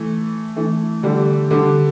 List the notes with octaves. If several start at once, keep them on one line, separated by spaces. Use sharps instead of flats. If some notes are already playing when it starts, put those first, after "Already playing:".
Already playing: E3 A3
E3 A3
D3 G3
D3 G3